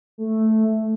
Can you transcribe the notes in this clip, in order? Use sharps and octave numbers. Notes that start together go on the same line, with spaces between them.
A3